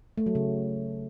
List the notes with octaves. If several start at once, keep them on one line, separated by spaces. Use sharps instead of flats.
A3
F#3
C#3